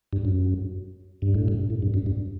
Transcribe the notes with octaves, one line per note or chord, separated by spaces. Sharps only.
G2
F#2
G2
A2
G2
A2
G2
F#2
G2